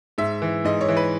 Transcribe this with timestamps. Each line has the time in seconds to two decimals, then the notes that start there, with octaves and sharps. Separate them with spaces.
0.18 G#2 E5
0.42 E3
0.64 G#2 D#5
0.81 C#5
0.88 E3
0.97 B4